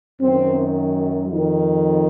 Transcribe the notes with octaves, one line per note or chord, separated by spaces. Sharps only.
F#2 D#3 C4
F2
D#3